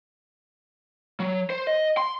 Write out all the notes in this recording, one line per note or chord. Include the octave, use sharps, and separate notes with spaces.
F#3
C5
D#5
C6